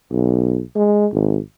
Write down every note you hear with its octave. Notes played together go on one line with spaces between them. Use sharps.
B1
G#3
G#1